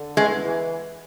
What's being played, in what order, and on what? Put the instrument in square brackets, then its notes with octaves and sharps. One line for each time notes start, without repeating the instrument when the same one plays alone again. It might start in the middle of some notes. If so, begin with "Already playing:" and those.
Already playing: [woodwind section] D3
[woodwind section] E2 [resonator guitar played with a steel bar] G#3
[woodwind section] E3